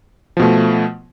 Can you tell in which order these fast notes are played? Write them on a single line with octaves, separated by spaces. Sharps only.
F3 B2 A3